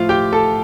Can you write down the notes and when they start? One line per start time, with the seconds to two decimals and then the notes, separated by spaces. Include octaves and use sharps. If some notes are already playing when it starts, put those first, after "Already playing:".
Already playing: A2 F3 F4 F5
0.09 G4 G5
0.32 A4 A5